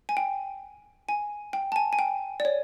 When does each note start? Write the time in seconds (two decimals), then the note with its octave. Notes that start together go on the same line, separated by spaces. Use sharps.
0.09 G#5
0.17 G5
1.09 G#5
1.53 G5
1.72 A5
1.76 G#5
1.93 G#5
1.99 G5
2.40 D5
2.45 C#5